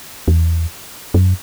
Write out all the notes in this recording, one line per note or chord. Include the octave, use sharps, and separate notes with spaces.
E2
F#2